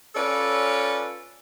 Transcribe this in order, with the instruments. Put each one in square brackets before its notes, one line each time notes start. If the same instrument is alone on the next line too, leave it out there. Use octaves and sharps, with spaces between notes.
[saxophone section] C#4 F4 A4 B4 C#5 D5